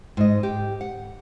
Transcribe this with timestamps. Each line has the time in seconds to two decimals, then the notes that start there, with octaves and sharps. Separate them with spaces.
0.17 G#2 D#5
0.43 G4
0.81 F#5